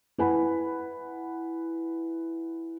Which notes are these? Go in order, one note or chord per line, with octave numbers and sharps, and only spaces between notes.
E4 B4 F#5 G#5 B5